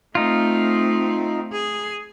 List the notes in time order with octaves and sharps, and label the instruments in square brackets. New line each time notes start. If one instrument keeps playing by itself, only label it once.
[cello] A3 C4 [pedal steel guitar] D#4 F4
[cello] G#4